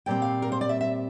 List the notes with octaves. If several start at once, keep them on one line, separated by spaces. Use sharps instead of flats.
A#2 G3 C4 G5
F5
A#4
C5
D5
E5
E5